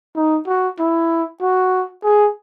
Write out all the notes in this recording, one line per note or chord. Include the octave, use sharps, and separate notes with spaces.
D#4
F#4
E4
F#4
G#4